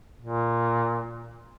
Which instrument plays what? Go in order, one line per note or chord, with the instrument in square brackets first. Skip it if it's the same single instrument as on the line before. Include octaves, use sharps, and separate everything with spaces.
[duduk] A#2